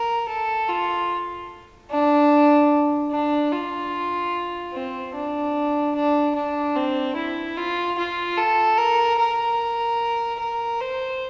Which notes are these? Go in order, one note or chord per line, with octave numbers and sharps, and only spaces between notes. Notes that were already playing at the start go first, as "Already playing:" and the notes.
Already playing: A#4
A4
F4
D4
D4
F4
C4
D4
D4
D4
C4
E4
F4
F4
A4
A#4
A#4
A#4
C5